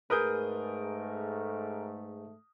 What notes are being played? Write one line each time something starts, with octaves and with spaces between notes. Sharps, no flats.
G#2 A3 G#4 A#4 B4 D#6 G6